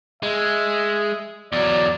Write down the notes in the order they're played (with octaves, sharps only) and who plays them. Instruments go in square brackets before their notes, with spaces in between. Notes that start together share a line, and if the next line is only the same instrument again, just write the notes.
[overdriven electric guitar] G#3 [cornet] E5
[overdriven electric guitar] E2 F#3 [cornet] D5